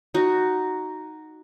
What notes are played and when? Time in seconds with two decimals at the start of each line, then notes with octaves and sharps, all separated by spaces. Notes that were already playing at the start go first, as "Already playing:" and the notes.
0.14 D#4 F#4